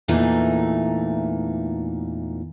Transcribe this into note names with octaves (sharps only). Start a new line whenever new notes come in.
E2 A#2 E3 A3 D#4